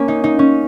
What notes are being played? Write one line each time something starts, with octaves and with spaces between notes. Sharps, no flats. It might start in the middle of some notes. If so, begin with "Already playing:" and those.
Already playing: A#3 C#4
D#4
D#4
C#4